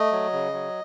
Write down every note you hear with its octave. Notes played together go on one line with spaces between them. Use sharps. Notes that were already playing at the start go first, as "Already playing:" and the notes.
Already playing: A3 D#5
F#3
C#3
F#3